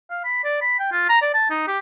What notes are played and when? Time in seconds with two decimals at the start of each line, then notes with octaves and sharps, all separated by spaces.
0.10 F5
0.24 B5
0.44 D5
0.61 B5
0.79 G5
0.92 F4
1.09 A#5
1.22 D5
1.34 A5
1.50 D#4
1.67 G4